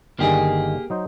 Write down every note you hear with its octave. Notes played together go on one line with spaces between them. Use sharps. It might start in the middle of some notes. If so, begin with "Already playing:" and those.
G1 D3 D#3 A#3 G4 G#4
F#3 D#4 C5